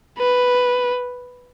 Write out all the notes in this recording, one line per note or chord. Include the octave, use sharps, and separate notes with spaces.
B4